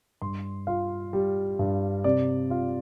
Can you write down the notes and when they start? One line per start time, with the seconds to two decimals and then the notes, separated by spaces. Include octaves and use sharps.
0.22 G2 C6
0.67 F4 F5
1.13 G3
1.59 G2
2.04 C3 D5
2.50 F4 F5